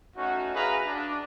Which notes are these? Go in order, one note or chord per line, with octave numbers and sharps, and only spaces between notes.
A3 C#4 D#4 F#4
F#4 G#4 B4 E5 F5 A#5
D4